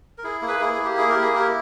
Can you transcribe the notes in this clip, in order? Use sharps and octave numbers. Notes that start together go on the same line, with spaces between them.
A#4
E4 G#4
A#3
G#4 B4
E4 G#4
G#4
A#3
G4
E4 G#4
G4 A#4
A#3
G#4
E4 G4 A#4